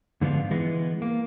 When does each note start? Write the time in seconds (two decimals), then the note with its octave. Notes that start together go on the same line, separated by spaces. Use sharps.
0.21 G#2 D3 F3 B3 D4 F4
0.51 E3 G#3 B3
1.02 A#3